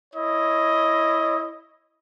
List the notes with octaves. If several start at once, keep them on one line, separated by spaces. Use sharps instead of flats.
E4 C#5 D#5